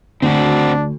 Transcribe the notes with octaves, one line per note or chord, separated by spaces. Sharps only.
D2 C4 D4 F#4